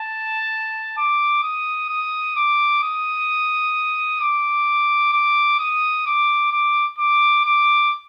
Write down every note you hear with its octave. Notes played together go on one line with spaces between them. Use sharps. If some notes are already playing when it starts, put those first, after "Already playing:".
Already playing: A5
D6
D#6
D#6
D6
D#6
D6
D6
D#6
D6
D6
D6
D6